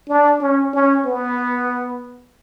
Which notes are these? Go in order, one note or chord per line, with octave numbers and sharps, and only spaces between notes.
D4
C#4
C#4
B3